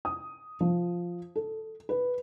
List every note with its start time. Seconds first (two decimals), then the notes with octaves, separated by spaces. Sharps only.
0.05 D#6
0.60 F3
1.36 A4
1.89 B4